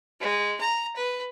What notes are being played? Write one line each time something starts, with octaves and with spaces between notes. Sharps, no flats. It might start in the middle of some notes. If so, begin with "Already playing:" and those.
G#3
A#5
B4